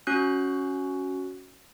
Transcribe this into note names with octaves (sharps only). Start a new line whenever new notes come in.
C#4 F#4 F#6